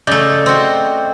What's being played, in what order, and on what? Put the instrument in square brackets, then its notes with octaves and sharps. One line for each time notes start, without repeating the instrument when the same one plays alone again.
[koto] C#3 A3 [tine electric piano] D5 D#5 G6
[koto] C4 F#4